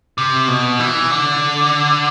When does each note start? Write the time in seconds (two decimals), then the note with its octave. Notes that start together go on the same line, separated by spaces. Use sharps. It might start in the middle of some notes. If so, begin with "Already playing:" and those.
0.18 C3
0.48 B2
0.80 E3
1.11 D3